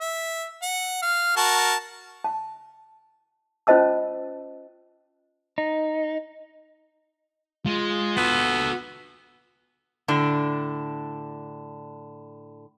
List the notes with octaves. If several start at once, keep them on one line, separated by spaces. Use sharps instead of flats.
E5
F#5
F5
F#4 A#4 A5
A5
C#4 F4 C5 D#5 A5 E6
D#4
G#3 F4
B3 F#4 A4
A2 D3 D4